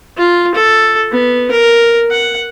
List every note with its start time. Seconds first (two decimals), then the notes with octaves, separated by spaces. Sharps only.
0.18 F4
0.54 A4
1.12 B3
1.51 A#4
2.11 F#5